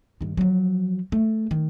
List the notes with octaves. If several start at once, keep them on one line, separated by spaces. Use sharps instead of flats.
G2 D#3
F3 F#3
A3
D#3